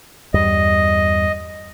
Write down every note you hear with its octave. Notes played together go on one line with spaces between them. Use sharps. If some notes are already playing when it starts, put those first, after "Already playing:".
E2 G2 G3 D#5